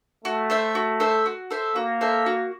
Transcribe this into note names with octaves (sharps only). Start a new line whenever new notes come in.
A3 F#4
A4 C5 E5
F#4
A4 C5 E5
F#4
A4 C5 E5
A#3 F#4
A4 C5 E5
F#4